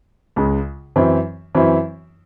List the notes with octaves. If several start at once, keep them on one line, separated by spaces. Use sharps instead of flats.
C#2 C#3 G#3
F#2 E3 C4 E4
F#2 E3 C4 E4